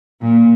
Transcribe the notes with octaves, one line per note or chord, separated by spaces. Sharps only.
A#2